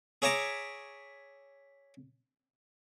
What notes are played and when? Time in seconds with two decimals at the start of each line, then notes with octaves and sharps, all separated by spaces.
0.22 G#4 C#5 E5 A#5 D6